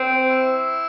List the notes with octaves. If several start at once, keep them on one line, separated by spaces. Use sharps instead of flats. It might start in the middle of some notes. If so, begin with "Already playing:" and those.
Already playing: C4
E4